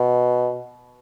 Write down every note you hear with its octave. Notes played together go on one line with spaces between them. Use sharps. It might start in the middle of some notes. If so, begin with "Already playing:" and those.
Already playing: B2